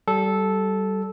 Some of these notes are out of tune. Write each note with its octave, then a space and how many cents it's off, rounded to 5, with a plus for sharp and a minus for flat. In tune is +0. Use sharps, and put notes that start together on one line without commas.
G3 -25 A4 -10